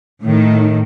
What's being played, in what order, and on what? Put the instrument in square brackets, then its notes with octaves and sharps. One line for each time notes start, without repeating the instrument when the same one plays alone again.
[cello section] A2 D#3